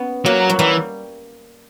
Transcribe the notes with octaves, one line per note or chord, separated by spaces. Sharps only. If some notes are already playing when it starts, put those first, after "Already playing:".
Already playing: B3 C#4
F#3 A#3
F#3
E3 G3